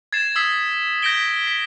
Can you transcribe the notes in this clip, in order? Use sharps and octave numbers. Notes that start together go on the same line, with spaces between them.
G#6 A6 C7 E7
D#6 E6 G#6 B6 C7
G6 A#6 B6 D7 G7
B6